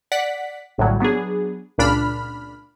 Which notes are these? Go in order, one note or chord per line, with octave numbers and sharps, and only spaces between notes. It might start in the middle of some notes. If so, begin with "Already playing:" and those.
D5 F#5 B6
A#1 A2 D3 F#3 G3
F#3 B3 D4 G#4
C#2 A#2 D4 B5 F6